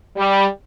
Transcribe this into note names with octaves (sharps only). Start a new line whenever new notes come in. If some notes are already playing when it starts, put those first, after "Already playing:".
G3